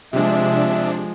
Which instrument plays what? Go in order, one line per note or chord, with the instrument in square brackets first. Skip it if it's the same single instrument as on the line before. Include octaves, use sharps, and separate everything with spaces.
[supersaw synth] C3 D4 [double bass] F3 G#3 [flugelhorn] E5